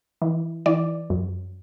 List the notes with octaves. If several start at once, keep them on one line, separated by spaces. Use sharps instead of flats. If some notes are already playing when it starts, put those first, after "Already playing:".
E3
E3 D5
F#2